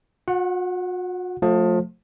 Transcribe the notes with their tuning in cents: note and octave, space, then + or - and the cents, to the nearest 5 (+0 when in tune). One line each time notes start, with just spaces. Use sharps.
F#4 -45 F#5 +0
F3 +30 A3 +0